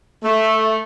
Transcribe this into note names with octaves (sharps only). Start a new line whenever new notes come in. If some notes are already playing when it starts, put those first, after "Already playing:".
A3